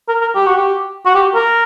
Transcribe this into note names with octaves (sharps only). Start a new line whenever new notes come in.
A#4
A#4
G4
F#4
G4
F#4
G4
A#4